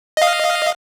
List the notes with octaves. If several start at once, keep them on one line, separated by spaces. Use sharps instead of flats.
D#5 F5